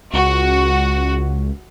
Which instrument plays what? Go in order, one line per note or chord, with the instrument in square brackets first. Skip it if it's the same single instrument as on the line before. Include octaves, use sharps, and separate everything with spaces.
[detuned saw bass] C#2 [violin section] F#4